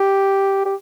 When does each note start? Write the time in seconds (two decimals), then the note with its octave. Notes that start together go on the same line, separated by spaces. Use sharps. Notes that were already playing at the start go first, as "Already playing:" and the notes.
Already playing: G4
0.65 G4